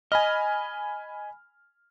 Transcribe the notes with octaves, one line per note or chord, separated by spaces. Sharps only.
D#5 G#5 B5 F6